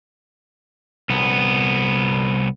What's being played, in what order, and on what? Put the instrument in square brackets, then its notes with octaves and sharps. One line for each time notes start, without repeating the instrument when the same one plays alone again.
[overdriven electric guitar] C2 B3